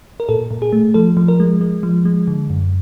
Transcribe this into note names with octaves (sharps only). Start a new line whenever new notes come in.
A#4
A#2 A4
A#2
G#4
A3
F3 A4
F3
A#4
G#3
G#3
F3
G#3
D3
F#2